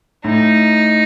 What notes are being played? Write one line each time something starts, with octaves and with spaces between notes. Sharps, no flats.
A2 D#4